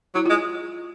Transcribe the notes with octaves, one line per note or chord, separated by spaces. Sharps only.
F#3 E4
F4
G#3